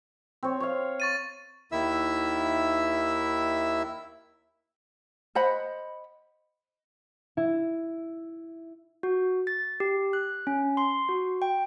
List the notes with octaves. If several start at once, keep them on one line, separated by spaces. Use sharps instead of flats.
C4 C#5
C#5 F5
C#6 A6 D#7
D#2 D#3 E4 E5 E6
C5 D#5 F#5 B5
E4
F#4
A6
G4
F#6
C#4
C6
F#4
G5